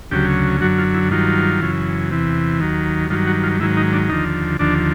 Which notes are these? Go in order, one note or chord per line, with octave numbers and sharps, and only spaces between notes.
D2 C#3 F#3 G4
F#2 D3 F#3 F#4
F4
E4
G2 D#3 F#3 F4
F#2 C#3 E3
E2 C3 E3
D#2 D#3 F#3
G2 D#3 F#3 F4
F#4
F4
G#2 D#3 F#3 E4
D#4
D4
D#2 D3 F3 D#4
D#2 D3 F3 D4